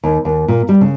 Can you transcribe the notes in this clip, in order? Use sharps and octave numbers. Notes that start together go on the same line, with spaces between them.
D#2
D#2
A#2
G3
C#3